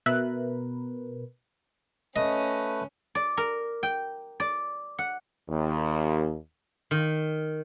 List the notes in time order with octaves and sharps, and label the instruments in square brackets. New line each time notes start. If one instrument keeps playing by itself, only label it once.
[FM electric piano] B2 A#4 B4 [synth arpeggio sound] E5 F#6
[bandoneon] A3 B4 [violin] C#4 [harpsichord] D#5
[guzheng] D5
A#4
G5
D5
F#5
[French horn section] D#2
[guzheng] D#3